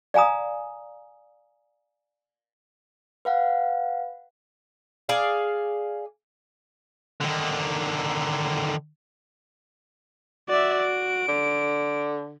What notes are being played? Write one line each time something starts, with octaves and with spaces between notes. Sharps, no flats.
D5 F5 G#5 A#5 D#6
B4 F5 F#5
G#4 D5 F5
D3 D#3
F#4 D5 E5
D7
D3